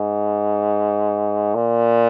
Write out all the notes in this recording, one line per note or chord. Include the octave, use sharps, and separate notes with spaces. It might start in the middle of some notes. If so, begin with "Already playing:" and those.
Already playing: G#2
A#2